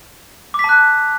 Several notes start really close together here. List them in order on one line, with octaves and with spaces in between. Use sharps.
D6 B6 A5 F#6